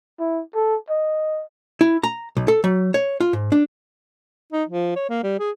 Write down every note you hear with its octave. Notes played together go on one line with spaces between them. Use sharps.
E4
A4
D#5
E4
A#5
B1
A4
F#3
C#5
F4
G#2
D4
D#4
F3
C#5
A#3
G3
G#4